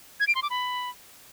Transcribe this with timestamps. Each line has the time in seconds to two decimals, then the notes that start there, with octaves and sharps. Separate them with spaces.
0.20 G#6
0.28 D7
0.35 C6
0.43 D6
0.50 B5